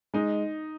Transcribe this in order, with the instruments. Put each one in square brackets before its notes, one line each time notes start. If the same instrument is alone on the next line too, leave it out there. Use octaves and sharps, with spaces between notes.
[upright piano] G#3 [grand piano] D#4